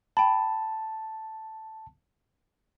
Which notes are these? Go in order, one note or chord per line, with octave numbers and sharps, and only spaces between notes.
G5 A5 B5